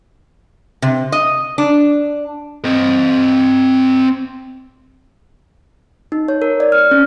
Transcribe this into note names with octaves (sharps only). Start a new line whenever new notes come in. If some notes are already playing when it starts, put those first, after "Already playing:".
C3
D#5
D4
C4 D#5
D#4
C#5
A#4
D5
F6
C#4